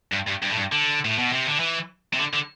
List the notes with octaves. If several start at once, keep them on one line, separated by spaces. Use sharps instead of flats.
G2
G2
G2
A2
G2
D3
A2
B2
C3
D3
E3
C3
D3
D3